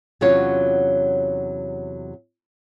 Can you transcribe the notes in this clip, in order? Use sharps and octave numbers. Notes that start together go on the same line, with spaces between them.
E2 C3 F#3 C#4 F4 C#5